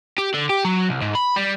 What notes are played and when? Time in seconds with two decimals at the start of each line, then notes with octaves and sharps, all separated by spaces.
0.18 G4
0.34 D3
0.50 G4
0.65 F#3
0.89 C2
1.02 G#2
1.15 B5
1.37 G3